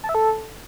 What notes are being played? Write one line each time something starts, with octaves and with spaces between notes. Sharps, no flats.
A5
E5
A4